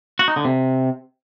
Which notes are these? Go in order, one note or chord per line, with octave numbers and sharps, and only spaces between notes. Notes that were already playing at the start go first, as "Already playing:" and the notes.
F#4
D#4
D3
C3